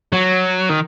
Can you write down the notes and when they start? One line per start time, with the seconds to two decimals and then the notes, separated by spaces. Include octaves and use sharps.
0.13 F#3
0.69 D#3